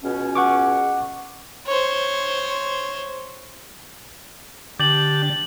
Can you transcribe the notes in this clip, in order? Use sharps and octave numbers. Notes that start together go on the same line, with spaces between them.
C#2 B2 C#4
F#5 C#6 D6
C5 C#5
D3 D4 G4 G6 A6 F#7